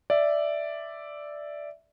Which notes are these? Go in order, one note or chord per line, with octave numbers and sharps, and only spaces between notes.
D5 E5